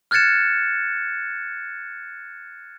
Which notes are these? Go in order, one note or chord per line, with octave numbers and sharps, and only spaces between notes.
F6 F#6 G#6 A6 C#7 E7